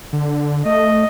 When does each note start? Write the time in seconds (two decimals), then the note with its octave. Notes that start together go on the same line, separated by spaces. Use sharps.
0.13 D3
0.65 A3 D#5